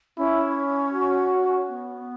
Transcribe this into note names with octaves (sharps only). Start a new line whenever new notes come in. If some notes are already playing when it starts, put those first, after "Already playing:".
C#4 E4
F#4
B3